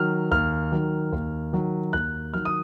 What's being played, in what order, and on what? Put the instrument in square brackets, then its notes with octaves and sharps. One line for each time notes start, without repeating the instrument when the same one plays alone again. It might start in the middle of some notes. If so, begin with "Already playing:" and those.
Already playing: [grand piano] D#3 F#3 F6
D#2 F6
D#3 F#3
D#2
D#3 F#3
D#2 F#6
D#3 F#3 F6
D#6